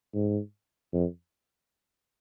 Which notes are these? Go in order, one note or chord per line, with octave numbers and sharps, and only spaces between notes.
G#2
F2